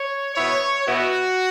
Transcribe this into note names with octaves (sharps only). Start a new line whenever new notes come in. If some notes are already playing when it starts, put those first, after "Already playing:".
Already playing: C#5
B2 B3 E4 C#5
B2 B3 E4 F#4